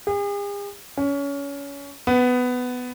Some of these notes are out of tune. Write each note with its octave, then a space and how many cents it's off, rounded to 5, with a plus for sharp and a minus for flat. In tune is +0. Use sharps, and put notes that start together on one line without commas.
G#4 -45
C#4 +25
B3 +10